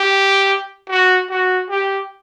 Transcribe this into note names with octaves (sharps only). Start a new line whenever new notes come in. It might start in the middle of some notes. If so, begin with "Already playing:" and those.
Already playing: G4
F#4
F#4
G4